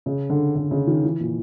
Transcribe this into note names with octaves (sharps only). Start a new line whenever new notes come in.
C#3
D3
D3
C#3
D#3
E3
A#2